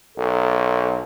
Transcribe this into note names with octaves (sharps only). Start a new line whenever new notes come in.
B1 A4